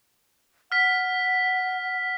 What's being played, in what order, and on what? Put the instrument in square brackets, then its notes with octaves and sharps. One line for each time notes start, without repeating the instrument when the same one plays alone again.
[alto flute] F#5 [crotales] F6 B6